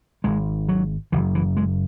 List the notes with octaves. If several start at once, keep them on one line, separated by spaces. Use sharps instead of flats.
G#1 G#2 G#3
F#3
F#1 F#2 C#3 E3
E3
G#3